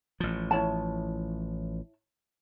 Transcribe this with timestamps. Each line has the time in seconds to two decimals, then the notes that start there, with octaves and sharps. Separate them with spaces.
0.20 A1 F3
0.51 E4 C#5 A5